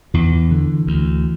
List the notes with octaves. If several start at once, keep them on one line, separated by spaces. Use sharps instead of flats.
E2 E3
D3
D2